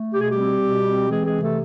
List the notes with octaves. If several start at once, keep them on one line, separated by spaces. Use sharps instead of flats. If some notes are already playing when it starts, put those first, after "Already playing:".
Already playing: A3
B2 G4
G#4
G3 G4
C4
B2
C4
E3 G#3 G#4
G#3 G#4
C3
A3 A4